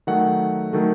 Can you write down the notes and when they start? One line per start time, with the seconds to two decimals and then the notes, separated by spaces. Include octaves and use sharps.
0.07 D#3 F#3 A3 F#5
0.73 D#3 F#3 A3